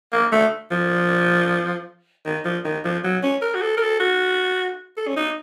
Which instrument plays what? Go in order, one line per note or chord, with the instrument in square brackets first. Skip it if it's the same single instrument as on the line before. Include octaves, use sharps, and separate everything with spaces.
[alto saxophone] A#3
A3
F3
D#3
F3
D#3
F3
F#3
C#4
A#4
F#4
A4
A#4
A4
F#4
A4
C#4
D#4